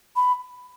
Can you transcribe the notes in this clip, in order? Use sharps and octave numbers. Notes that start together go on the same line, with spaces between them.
B5